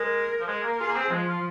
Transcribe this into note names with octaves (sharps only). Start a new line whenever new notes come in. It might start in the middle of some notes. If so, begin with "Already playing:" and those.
Already playing: G#3 A#4
F3
G#3 A#4
A#3
F4 G#4
A#3
C4
F3 G#3
F4